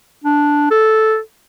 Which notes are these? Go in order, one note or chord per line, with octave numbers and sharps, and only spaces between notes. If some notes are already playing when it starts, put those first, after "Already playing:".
D4
A4